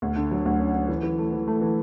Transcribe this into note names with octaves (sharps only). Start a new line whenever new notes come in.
D2
D3
F#3
D2
C#4
C#4
E3
E3
A3
E3
A3
E3